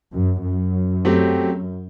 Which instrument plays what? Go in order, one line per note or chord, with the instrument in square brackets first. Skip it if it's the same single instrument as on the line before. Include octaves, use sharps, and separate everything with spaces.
[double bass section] F#2
F#2
[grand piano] F#3 A3 C4 G4